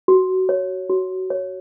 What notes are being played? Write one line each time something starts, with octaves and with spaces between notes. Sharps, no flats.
F#4
C#5
F#4
C#5